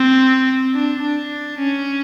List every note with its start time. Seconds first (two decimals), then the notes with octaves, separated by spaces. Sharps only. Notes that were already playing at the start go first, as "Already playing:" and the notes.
Already playing: C4
0.74 D4
1.02 D4
1.59 C#4